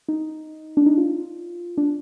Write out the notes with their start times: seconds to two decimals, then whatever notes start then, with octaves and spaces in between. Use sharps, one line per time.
0.08 D#4
0.77 D4
0.86 D#4
0.97 F4
1.77 D4